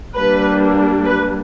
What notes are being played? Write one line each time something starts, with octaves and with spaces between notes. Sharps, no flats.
G3 A#3 D4 B4
B4